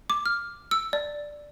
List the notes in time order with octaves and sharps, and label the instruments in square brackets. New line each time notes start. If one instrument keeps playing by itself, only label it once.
[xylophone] D6
F6
E6
D5